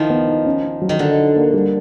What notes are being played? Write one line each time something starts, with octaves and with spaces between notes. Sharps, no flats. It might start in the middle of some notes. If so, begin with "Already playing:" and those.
Already playing: D#3 F3 D#4 E4
B3
D#4
C#4
C#4
F#3
D#3
D3 F#3
D#4
A#3
G3